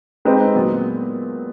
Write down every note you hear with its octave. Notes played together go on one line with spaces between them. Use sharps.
G#3 C4 D#4 G4 B4
A#2 F#3 B3